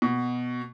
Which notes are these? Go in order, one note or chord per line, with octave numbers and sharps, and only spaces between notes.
B2